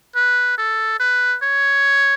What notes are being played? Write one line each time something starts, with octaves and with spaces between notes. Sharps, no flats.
B4
A4
B4
C#5